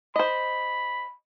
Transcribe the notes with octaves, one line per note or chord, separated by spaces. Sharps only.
C5 D#5 B5